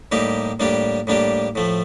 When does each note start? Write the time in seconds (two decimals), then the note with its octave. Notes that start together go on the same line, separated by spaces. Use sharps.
0.12 A2 G3 A#3 D#4 G4
0.60 A2 G3 A#3 D4 G4
1.07 A2 G3 A#3 D4 G4
1.55 A2 F3 A3